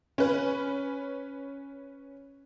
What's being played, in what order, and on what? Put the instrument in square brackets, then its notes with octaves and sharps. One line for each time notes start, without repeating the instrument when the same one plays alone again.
[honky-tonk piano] C#4 B4